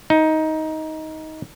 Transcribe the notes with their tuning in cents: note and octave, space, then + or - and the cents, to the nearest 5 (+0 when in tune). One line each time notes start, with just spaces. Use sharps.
D#4 +15